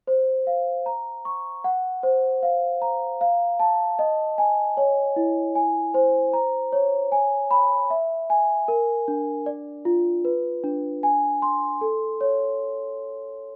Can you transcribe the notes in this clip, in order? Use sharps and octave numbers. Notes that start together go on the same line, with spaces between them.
C5
F5
A#5
C#6
F#5
C5
F5
A#5
F5
A5
D#5
G#5
C#5
E4
G#5
C5
A#5
C#5
G#5
B5
E5
G#5
A#4
D4
D5
F4
B4
D4
G#5
C6
A4
C#5